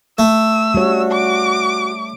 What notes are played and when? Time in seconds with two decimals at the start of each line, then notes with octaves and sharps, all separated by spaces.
0.18 A3 E6
0.74 G3 F#4 C#5
1.11 D6